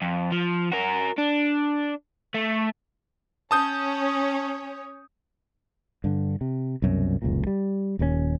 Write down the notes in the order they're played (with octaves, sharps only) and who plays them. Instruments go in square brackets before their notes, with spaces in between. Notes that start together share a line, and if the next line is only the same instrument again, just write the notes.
[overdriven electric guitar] F2
F3
F#4 A#4
D4
A3
[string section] C#4 C#5 [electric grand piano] A5 D#6 G6
[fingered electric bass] G2 D3
C3
C2 F#2 B2
F1 C#2 F#2 A#2
G3
D#1 D#2 F3 C#4